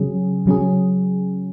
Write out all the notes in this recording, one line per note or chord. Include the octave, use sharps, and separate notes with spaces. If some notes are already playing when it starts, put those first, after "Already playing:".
Already playing: C#3 F#3 C#4 G#4
C#3 F#3 C#4 G#4